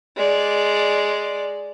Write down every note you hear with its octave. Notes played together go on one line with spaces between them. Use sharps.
G#3 D5